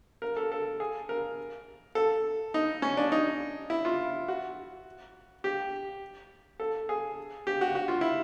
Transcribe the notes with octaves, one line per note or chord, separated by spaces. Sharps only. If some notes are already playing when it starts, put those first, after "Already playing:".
A#4
A4
A4
G#4
A#4
A4
D#4
C#4
D4
D#4
E4
F4
F#4
G4
A4
G#4
G4
F#4
F#4
F4
E4